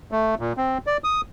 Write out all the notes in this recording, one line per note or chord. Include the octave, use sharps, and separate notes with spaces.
A3
A#2
C4
D5
D#6